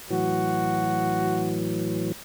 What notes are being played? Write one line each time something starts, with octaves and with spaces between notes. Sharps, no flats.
A2 E3 F#3 F#4